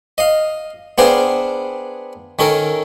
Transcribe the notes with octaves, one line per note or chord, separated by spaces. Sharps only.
D#5 F5
B3 D4 G#4 C5 F5 G5
D#3 C#4 A4 A#4